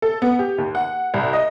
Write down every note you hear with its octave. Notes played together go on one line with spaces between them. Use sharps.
A4
B3
G4
D#2
F#5
C2
D#5